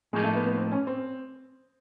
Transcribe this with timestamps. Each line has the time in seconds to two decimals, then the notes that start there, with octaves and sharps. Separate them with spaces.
0.13 A2 F3 G#3 A#3 D#4
0.24 A3
0.35 B3
0.46 B3
0.58 C4
0.72 C#4
0.87 C4